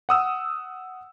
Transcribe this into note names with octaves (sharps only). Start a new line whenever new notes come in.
F#5 D#6 E6